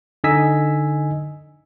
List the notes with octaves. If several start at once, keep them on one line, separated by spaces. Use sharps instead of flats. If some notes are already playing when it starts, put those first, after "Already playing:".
D3 D#4 D#5 G#5 E6 B6